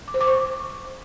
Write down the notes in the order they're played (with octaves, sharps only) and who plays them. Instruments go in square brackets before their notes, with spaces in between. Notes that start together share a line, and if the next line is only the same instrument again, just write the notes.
[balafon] D6
C5
D6
C#6